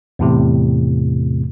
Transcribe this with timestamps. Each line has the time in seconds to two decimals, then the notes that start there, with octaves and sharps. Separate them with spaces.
0.19 E2 A2 C3